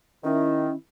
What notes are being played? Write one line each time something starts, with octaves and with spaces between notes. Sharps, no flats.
D#3 C#4 E4